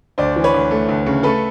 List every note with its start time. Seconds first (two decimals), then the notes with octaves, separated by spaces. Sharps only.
0.18 D2 C5 D5
0.36 E3
0.44 B4 C#5
0.54 D2
0.71 A3
0.89 D2
1.06 C#3
1.23 A3 A4 B4